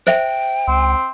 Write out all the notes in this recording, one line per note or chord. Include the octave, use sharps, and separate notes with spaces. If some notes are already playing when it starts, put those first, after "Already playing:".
C5 E5 G5
C#2 C4